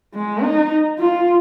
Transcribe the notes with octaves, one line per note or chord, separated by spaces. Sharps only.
G#3
D#4
F4